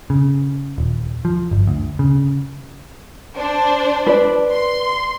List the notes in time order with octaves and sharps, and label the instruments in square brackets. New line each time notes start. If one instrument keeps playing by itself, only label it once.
[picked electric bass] C#3
D#1
F3
G1
D2
C#3
[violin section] D4 C5
[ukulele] B4 D5
[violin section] C6